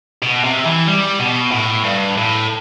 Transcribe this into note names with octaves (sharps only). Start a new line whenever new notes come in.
B2
C3
E3
G3
B2
A2
G2
A2